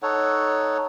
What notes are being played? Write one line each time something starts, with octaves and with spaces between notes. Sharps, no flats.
D#4 A4 C#5 F#5